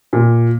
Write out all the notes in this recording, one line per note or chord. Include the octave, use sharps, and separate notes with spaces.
A#2